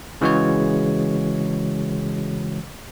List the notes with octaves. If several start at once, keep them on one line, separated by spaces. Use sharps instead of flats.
C#3 E3 G#3 F#4 C#5